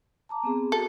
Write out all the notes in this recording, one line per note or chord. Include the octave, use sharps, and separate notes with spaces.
A5 A#5 D6
B3 C4 G#4
F#4 A4